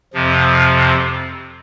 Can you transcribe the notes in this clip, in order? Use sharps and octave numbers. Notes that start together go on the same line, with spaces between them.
F2 C3 F3